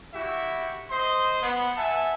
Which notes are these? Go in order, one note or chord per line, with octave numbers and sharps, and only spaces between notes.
E4 F#4 G4 E5
C5 D#5 C6
B3
E5 F#5 G#5 A5